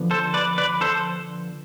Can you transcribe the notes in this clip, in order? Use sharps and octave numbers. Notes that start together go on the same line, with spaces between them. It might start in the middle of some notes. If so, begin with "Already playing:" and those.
Already playing: D3 F3 B3
A4 C5
B4 D5
B4 D5
A4 C5